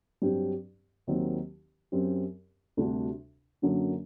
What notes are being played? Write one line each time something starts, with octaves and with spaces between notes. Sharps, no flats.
G2 F#3 C4 G4
D#2 D#3 F#3 C4
F#2 F#3 C4 G4
D2 C3 G3 D4 F#4
F#2 D3 F#3 A#3 D4